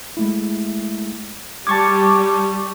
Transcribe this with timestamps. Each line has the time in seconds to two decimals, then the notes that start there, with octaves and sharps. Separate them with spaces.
0.17 G#3 A3 E4
1.67 G3 A5 C#6 D6 G#6